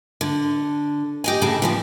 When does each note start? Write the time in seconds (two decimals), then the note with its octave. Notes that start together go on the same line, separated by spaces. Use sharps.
0.21 D3
1.24 G4 D#5 G#5
1.41 A2 C#3 A3 G#4 A4
1.62 E3 F3 B3